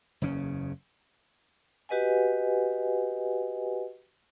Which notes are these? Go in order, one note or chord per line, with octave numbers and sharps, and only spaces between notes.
F#1 E2 C#3 C#4
F#4 G4 B4 D#5 F#5 G#5